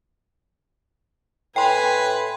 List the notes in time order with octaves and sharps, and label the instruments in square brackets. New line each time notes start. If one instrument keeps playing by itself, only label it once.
[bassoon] A2 [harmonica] B4 [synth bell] G5 C6 [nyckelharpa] G#5